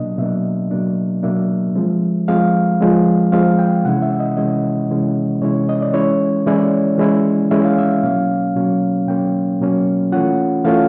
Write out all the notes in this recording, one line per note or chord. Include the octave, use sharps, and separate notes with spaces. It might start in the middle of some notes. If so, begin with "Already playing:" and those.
Already playing: B2 F#3 A#3 D4 D#5
B2 F#3 A#3 D4 E5
B2 F#3 A#3 D4
B2 F#3 A#3 D4 E5
F3 G#3 C4
F3 G#3 C4 F5
F3 G#3 C4
F3 G#3 C4 F5
G5
C3 E3 G#3 C#4 E4 F#5
E5
D#5
C3 E3 G#3 C#4 E4 D#5
C3 E3 G#3 C#4 E4
C3 E3 G#3 C#4 E4 C#5
D#5
D5
E3 G#3 C#4 E4 C#5
E3 G#3 C#4 E4 D5
E3 G#3 C#4 E4
E3 G#3 C#4 E4 E5
F5
E5
B2 F#3 A#3 C#4 F5
B2 F#3 A#3 C#4
B2 F#3 A#3 C#4 G5
B2 F#3 A#3 C#4
E3 A3 C#4 F4 F#5
E3 A3 C#4 F4 F5